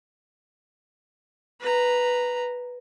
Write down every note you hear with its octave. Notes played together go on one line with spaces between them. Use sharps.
B4 A#5